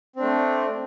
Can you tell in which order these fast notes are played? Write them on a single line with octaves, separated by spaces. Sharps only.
C4 D4 A3